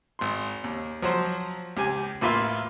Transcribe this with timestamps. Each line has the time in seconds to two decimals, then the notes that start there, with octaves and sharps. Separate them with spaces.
0.19 G#1 C6
0.64 D#2
1.02 F3 F#3 C5
1.77 C#2 G4 G#5
2.21 A1 A#3 F4 B4 E5 C6